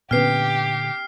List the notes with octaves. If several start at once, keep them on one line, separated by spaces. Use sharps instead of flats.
A#2 D3 B3 C#4 G4 B4 F6 C7